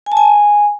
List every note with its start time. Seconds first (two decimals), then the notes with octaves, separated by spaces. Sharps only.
0.06 G#5
0.12 A5
0.17 G#5